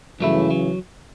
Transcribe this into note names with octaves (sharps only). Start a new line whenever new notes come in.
G2 C#3 E3 F#3 A3 E4
F#3